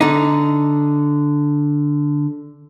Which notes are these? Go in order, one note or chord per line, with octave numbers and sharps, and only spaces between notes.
D3 D#4